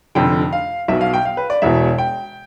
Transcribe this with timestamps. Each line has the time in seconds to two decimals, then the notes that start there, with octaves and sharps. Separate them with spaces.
0.15 F1 F2 D3 G5
0.53 F5
0.88 B1 B2 E5
1.01 F5
1.13 G5
1.25 F5
1.37 B4
1.50 D5
1.62 E1 E2 B2 E5
1.98 G5